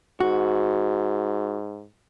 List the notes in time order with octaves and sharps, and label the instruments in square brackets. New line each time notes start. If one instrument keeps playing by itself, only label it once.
[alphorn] G#2 [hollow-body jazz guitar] F#4